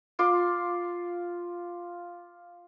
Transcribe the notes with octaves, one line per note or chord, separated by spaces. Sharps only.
F4 C6 D6